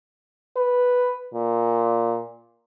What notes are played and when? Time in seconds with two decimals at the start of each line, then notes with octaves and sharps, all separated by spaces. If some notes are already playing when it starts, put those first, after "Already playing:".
0.56 B4
1.34 A#2